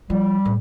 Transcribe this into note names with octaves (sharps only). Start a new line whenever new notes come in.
F3 G3
A2